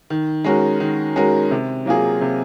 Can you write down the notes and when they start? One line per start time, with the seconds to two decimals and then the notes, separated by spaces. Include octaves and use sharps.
0.10 D#3
0.44 G#3 C#4 F#4 A#4
0.80 D#3
1.16 G#3 C#4 F#4 A#4
1.51 C3
1.86 F#3 A#3 F4 G#4
2.21 C3